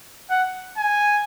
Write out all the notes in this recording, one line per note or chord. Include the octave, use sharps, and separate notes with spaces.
F#5
G#5